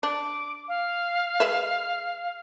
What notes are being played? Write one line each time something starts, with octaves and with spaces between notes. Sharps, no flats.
D4 D6
F5
G#3 B4 E5